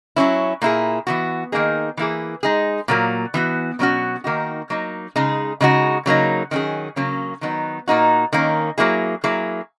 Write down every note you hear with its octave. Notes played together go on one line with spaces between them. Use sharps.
F#3 C#4 E4
A#2 A#3 E4 G#4
E3 B3 F#4
D#3 A#3 D#4 G#4
E3 A#3 E4 G#4
G#3 D#4 G#4
A#2 F#3 A#3
E3 B3 F#4
B2 F#3 C#4 F#4
D#3 A#3 D#4 F#4
F#3 A#3 D#4
C#3 G#3 D#4 G#4
C#3 G#3 D#4 F#4
C#3 F#3 A#3 D#4
D#3 F#3 C#4 G#4
C#3 F#3 A#3 C#4
D#3 F#3 B3 D#4
A#2 A#3 D#4 F#4
D#3 A#3 C#4
F#3 A#3 E4 G#4
F#3 A#3 E4 G#4